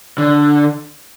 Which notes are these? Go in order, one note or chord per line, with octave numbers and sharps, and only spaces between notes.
D3